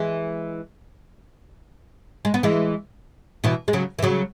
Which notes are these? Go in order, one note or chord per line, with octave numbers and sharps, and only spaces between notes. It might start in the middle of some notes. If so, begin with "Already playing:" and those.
Already playing: E3 G#3
G#3
B3
E3 G#3
B2 E3
G#3
C#3 F#3
E3
C#3 F#3